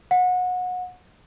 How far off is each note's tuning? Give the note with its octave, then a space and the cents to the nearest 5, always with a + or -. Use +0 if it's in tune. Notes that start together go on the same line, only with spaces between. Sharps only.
F#5 -25